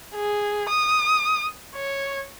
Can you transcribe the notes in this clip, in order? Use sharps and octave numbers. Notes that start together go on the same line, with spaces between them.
G#4
D#6
C#5